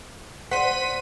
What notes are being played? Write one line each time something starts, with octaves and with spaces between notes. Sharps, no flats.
C5 F#5 C6 B6 D#7